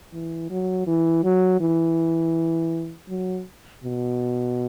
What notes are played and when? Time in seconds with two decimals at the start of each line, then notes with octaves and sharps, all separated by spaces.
0.13 E3
0.50 F#3
0.87 E3
1.24 F#3
1.61 E3
3.09 F#3
3.84 B2